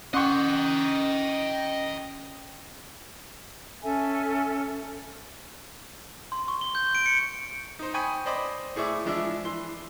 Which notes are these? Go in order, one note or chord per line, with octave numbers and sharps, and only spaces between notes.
C#4 D#5 F#5 G5 C6 C#6
C#4 A4 E5 G#5
C6
C#6
G7
G6
D7
C#7
D#4 C5
G5 G#5 B5 C#6 D#6
C5 D5 D#5 B5 D6
A2 G#4 D5 E5 C#6 D6
E3 F3 G#3 D4 D5 E5
E3 C6